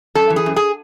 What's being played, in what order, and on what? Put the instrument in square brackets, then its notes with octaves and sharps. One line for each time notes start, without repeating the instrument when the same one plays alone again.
[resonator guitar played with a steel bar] F#2 A4
E3
G#4
F#2
G#4